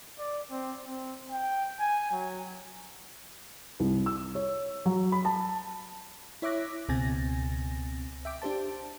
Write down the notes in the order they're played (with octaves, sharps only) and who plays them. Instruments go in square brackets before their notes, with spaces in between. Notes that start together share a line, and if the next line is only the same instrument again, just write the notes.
[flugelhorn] D5
C4
C4
G5
G#5
F#3
[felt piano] C2
E6
C#5
F#3
B5
A5
[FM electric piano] E4 C#5 E5 D6 F#6 A#6
C#2 B2 C4 G#5 A6 A#6
E5 G5 D6
D4 G4 C5 A5